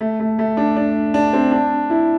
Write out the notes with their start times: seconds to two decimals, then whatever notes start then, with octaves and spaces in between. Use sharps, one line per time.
0.01 A3
0.20 A3
0.39 A3
0.57 D4
0.76 D4
1.14 D4
1.33 C4
1.52 D4
1.90 E4